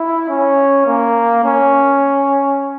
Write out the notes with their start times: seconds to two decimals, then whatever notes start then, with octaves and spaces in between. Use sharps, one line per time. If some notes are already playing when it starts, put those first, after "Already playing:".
Already playing: E4
0.29 C#4
0.86 A#3
1.44 C#4